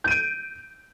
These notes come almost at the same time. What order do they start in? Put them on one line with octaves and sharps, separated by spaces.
G6 D#7 D7